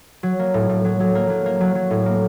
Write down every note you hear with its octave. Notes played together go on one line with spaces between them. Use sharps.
F#3
A#3
A2
A2
F#3
F#3
A#3
F#3
A#3
F#3
F#3
A2
A#3